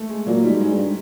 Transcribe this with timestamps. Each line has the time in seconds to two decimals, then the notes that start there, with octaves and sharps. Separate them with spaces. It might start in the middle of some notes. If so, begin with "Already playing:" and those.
Already playing: A3
0.09 G#3
0.26 A#2 F#3
0.43 G#2 G3
0.61 G#2 G#3
0.72 G2